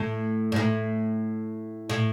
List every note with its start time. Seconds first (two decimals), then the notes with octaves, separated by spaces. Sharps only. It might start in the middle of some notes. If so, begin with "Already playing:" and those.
Already playing: A2
0.52 G#2
0.56 A2
1.89 A2